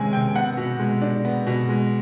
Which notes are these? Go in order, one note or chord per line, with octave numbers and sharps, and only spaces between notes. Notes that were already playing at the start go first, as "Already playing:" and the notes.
Already playing: C3 D#3 G#3 C#4 G#5
C3 G5
B3 F#5
B2
G#3
D4
B3
B2
G#3